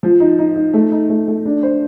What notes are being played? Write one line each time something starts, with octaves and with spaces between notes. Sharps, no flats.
F3
D#4
D#4
D#4
A3
D#4
A3
A3
D4
C5